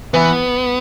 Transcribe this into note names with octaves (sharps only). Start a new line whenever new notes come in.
E3 B3